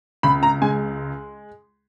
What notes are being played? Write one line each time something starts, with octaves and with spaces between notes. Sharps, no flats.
C#2 B5
A#5
G#3 G#5